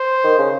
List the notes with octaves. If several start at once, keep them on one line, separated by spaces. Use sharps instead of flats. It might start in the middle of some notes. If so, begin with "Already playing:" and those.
Already playing: C5
D#3
C#3